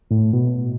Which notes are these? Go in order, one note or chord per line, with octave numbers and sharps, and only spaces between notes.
A2
B2